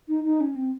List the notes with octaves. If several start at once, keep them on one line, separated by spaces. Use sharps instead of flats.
D#4
D#4
C#4
C4